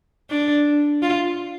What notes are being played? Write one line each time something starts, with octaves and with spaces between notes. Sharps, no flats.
D4
F4